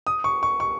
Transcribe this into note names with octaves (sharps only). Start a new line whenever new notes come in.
D#6
C#6
C#6
C#6